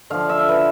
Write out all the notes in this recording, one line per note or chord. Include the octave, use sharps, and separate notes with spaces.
D3 F3 F5
E5
B4